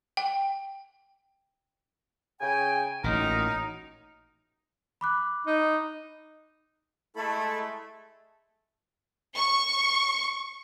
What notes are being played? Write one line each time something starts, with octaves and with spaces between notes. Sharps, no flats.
G5
C#3 G5 G#5
A1 A#2 F#3 D#4 A#4
B5 D6 F#6
D#4
G#3 A3 E4 A4 B5
C#6